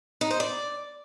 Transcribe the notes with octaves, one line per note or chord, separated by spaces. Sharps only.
D#4
C5
D5